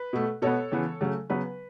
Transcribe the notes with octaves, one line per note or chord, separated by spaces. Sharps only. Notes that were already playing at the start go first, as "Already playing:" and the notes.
Already playing: B4
B2 A3
B2 B3 A4 C#5
C#3 E3 B3
C#3 F#3 A3
C#3 F#3 B3 B4